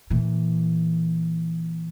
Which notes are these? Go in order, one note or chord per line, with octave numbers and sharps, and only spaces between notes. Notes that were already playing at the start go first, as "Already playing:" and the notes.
A#2 E3